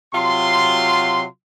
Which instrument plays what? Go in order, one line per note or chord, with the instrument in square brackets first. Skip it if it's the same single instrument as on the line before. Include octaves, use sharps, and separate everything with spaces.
[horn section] C3 F#3 F4 C6